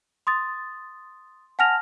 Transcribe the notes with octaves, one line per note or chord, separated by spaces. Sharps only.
C6 D#6 A6
F#5 G#5 A5 F6 A#6 F7